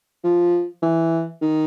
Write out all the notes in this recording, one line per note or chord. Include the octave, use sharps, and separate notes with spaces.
F3
E3
D#3